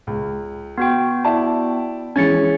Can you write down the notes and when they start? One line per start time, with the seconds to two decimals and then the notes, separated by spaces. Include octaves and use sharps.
0.07 C#2
0.78 B3 F#4 G5
1.24 E4 D5 A5
2.16 E3 G#3 C#4 G#6 A6 C#7